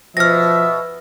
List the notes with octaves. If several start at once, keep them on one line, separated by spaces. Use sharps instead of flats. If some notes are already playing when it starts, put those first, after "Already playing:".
B2 F3 E5 F6 A#6